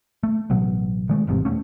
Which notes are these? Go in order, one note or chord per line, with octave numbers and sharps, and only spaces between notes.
A3
A1 B2 F#3
D#3 G#3 A3
G#1 E2 G#2 C3
E1 A3 C#4